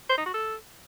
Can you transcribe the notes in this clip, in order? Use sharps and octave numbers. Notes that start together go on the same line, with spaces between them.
C5
D#4
F#4
A4